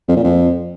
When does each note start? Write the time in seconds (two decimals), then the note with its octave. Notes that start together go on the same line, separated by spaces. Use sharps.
0.09 F2
0.16 A#2
0.24 F2